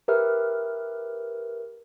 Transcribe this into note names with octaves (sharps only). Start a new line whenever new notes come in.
G4 A#4 B4 E5 F6